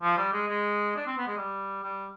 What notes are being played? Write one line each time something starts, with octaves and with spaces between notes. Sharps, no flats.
F3
G3
G#3
G#3
D4
C4
B3
G#3
G3
G3